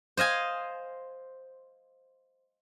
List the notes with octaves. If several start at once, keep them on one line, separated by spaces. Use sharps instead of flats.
C5 D#5 F5 G#5